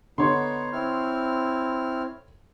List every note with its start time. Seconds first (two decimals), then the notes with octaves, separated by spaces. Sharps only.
0.18 D3 B3 D#4 C#5 C6
0.73 C4 E4 F6